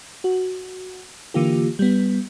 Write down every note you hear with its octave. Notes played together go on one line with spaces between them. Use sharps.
F#4
D3 E3 A#3 F4 G4
G3 B3